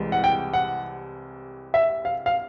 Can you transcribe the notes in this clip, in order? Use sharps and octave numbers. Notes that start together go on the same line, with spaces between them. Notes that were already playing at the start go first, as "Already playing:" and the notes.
Already playing: C2 C3 E3 G#3
F#5
G5
F#5
E5
F5
F5